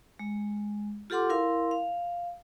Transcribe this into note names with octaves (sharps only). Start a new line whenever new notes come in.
G#3
F4 G4 A4 F#5 C6 D6
E4 A#4 F5 C6
F5